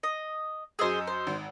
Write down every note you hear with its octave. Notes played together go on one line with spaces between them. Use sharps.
D#5
F#2 G#4 C5 D#5 E6
C5
G#1